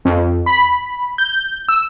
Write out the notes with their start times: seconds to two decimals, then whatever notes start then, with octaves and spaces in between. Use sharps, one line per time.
0.05 F2
0.46 B5
1.18 G6
1.69 E6